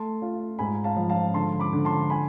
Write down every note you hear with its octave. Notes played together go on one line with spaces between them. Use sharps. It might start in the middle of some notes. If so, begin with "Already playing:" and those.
Already playing: A3 A5 C6
F4
G#2 G#5 B5
F5 A5
F3
F5 A5
D3 A5 C6
B5 D6
D3
A5 C6
G#5 B5